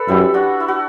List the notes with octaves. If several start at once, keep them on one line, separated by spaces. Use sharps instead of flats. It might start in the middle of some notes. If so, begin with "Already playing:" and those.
Already playing: A4 B4 D5
F#2 E4 G4
D4 F#4
E4
F#4